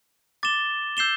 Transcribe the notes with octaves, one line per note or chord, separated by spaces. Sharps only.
D6 A6 E7 G7
E6 G6 C7 E7 G7